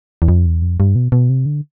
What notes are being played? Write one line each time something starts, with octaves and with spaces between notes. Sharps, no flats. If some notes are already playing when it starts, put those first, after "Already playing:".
E2
F2
E2
F2
G2
B2
B2
C3
D3